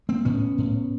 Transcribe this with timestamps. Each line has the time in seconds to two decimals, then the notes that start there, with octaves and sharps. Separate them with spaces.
0.09 A#3 C4
0.25 A2 B3 C#4
0.58 A2